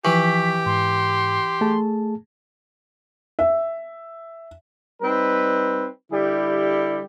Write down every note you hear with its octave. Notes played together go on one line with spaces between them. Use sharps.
E3 F3 G4 B4 C#6 B6
G#2 C6
A3 G#4 A5
E5
G3 C4 D#4 B4
D3 G3 E4 G4